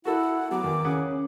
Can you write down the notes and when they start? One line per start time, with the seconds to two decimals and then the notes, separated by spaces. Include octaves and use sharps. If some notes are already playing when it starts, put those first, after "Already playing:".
0.05 E4 F#4 A4 F#5
0.51 F#3 B3 D6
0.64 E2 D#3
0.84 C#3 C#4 G#4 F#5